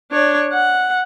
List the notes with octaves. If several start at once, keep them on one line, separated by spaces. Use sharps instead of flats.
D4 C#5
F#5